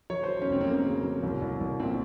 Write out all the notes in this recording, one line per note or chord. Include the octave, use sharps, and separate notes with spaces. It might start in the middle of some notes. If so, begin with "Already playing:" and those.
F#3 C#5
F#3 C5
C#4
F1 C4
C4
F#3 A#3
C#3
F#3
C2
C2
C2
A#2 C4